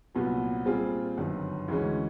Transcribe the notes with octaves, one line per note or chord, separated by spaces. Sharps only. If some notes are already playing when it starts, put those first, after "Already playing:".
C2 A#2 F#3 B3
A#2 G3 C4 F4 G#4
G1 F#2 D#3
D2 C#3 E3 G#3 C#4